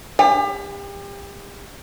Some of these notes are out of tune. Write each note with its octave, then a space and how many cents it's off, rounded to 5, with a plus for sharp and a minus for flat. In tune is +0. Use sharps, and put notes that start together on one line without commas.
G4 +35